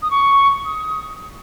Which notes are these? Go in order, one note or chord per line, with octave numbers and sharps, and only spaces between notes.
D#6
C#6
D#6